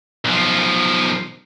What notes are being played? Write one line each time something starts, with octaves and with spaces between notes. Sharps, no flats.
B1 F3